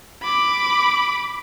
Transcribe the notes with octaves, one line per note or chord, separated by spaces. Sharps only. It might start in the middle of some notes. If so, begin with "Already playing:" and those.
B5 D6